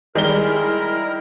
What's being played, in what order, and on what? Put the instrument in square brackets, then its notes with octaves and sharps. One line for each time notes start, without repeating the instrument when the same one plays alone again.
[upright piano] D#3 G3 G7 [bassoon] G#3 [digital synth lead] E4 [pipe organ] A#4 A#6